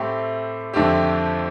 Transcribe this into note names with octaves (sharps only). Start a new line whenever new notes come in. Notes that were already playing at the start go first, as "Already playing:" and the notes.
Already playing: A2 A3 C4 G4
F2 D3 A3 C4 G4